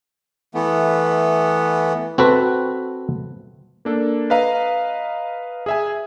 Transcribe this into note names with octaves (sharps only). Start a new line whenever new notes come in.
E3 A3 B3
C4 F#4 A4 B4
A#3 D4 A4
B4 D#5 F5 A#5
G#4 E5 G#5